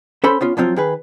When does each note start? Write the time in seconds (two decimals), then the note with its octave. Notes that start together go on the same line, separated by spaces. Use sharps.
0.24 C#4 A4 C5 B5 C6
0.41 B3 C#4 F4
0.57 F3 F#3 C4 F4
0.76 D#3 G#4 B4